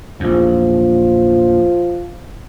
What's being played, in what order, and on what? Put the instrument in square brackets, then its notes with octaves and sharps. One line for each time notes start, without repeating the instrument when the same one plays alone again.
[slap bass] A#1 E2 [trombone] F3